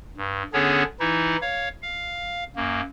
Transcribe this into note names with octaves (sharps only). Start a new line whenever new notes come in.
G2
D3 B3 C#4 D4 G#4 C#5
E3 D#4 E4
C#5 F5
F5
F#2 A#3